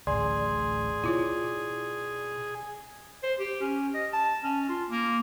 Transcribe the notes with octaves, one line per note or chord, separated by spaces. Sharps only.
A1 D2 G#4 D5 C6
B2 E4 F4 C#5
C5
G4
C#4
D#5
A5
C#4
F4
A#3